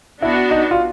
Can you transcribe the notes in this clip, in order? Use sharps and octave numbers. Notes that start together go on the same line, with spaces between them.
B3 D4 E4 F#4
D#4
F4